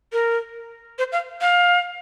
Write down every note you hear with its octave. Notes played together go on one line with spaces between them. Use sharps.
A#4
C5
F5
F5